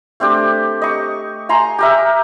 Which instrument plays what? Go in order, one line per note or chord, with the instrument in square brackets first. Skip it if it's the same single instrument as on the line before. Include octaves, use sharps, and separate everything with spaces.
[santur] A3 C4 D4 G4
D#5 C#6
G#5 A#5 C6 C#6
G4 A#4 E5